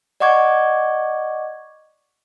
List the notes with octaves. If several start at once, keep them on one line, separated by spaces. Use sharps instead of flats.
D5 D#5 F#5 C#6 D6 G#6